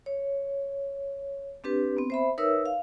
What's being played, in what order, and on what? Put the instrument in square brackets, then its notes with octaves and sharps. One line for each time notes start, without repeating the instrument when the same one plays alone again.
[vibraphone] C#5
C4 D4 G4 B4
B3 C4
C5 E5 B5
D#4 A#4 B4 C#5 E5 E6
F5